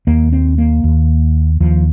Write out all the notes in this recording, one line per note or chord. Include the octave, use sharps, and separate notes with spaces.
D#2 A#3
C4
A#3
D#2
D#2 F3